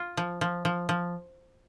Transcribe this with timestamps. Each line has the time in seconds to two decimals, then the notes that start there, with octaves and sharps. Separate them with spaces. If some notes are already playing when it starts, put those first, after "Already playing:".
Already playing: F4
0.17 F3
0.41 F3
0.65 F3
0.89 F3